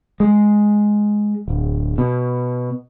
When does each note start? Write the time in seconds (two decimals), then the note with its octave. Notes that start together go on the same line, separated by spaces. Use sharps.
0.20 G#3
1.48 D1
1.98 B2